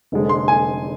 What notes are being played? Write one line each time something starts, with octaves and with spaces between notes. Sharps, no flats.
F1 F2 D3 G#3
C6
G#5